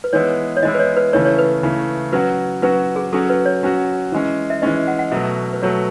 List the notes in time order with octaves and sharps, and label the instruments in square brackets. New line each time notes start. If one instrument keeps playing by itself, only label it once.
[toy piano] B4
[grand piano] E3 G#3 B3 E4 [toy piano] C#5
[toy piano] C#5
[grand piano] E3 G#3 B3 E4 [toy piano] D#5
[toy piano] B4
C#5
B4
[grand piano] C#3 E3 A3 [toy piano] C#5
[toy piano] C#5
B4
[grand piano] C#3 E3 A3
[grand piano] F#3 C#4 F#4 [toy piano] B4
[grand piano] F#3 C#4 F#4 [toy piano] B4
[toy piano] G#4
[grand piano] F#3 C#4 F#4 [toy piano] A4
[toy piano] B4
C#5
[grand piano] F#3 C#4 F#4
E3 G#3 C#4
[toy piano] E5
[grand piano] E3 G#3 C#4 [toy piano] D#5
[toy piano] F#5
F#5
[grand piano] B2 F#3 A3 [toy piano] E5
[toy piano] B4
[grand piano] B2 F#3 A3 [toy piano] C#5